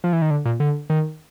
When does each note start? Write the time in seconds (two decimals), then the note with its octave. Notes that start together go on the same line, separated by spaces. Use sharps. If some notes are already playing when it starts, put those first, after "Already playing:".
0.04 F3
0.13 E3
0.22 D#3
0.31 D3
0.45 A#2
0.60 D3
0.90 D#3